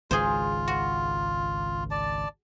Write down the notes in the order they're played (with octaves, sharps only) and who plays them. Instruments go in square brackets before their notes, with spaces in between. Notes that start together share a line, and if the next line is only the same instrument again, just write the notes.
[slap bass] G#1 C#2 [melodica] F4 [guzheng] G#4 C5
[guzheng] F#4
[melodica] D5 A5